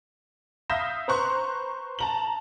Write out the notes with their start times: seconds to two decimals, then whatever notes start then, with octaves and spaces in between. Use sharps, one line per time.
0.70 E5 F5 D#6 G6 A#6 E7
1.08 B4 C5 A#5 C6 C#6 F#6
1.99 A5 A#5 F#7